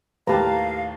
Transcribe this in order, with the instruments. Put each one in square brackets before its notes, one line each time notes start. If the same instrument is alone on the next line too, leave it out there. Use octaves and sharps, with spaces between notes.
[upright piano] D#2 A2 [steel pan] G4 B4 [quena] F5 [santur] A5 A#5